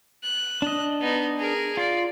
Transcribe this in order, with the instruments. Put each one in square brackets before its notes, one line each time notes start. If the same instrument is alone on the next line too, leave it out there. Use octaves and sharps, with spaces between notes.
[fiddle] F#6
[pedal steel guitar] D4 D#5
[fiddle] B3 D#4
G#4 A#4
[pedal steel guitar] F4 [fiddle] D5